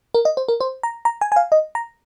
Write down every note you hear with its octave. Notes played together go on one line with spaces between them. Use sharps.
A#4
D#5
C5
A#4
C5
A#5
A#5
G#5
G#5
F5
D#5
A#5